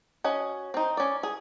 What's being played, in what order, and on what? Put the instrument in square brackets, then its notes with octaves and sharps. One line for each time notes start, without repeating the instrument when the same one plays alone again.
[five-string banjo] C#4 F#4 D#5
C4 D#4
C#4 D5
G#4